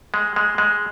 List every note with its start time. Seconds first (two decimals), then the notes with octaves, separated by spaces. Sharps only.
0.14 G#3
0.36 G#3
0.58 G#3